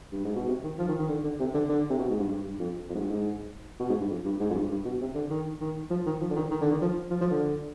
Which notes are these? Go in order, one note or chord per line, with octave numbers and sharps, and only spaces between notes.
G2
G#2
B2
C3
D#3
F3
D#3
D#3
D3
D3
C3
D3
D3
C3
B2
G#2
G2
G2
G2
F2
F2
G#2
G2
G#2
B2
G#2
G2
F2
G2
G#2
F2
G2
G2
B2
C3
D3
D#3
D#3
F3
D#3
F3
D3
D#3
D#3
D3
D#3
F3
F3
F3
D3